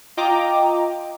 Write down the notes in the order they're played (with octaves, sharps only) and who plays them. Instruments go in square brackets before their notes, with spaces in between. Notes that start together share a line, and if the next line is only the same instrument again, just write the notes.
[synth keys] F4 D#5 G5 A#5 D6